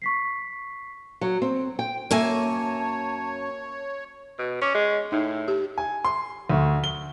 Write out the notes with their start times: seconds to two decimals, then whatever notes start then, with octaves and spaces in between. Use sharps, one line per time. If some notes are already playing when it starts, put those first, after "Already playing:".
0.02 C#6 B6 C7
1.21 F#3
1.42 C4
1.79 G5
2.11 F#2 A#3 C#5 E5 G#5 A5
4.39 B2
4.62 C#4 C#6 D6
4.74 G#3
5.12 A2 D#4
5.48 G4
5.78 G#5
6.05 C6
6.50 D2
6.84 G7